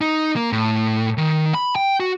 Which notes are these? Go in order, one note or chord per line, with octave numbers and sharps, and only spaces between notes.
D#4
A#3
A2
D#3
B5
G5
F#4